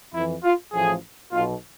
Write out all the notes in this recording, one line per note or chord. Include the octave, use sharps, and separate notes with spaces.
F2 E3 E4
F4
A1 A2 F3 G#4
B1 B2 F4